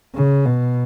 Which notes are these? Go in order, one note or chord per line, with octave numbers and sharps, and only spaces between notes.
C#3
B2